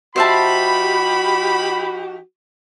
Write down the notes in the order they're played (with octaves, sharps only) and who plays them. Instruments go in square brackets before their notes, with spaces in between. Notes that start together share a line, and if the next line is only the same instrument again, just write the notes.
[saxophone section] F3 D#4 G4 [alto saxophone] F#4 [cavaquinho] C5 E5 A5 [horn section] B5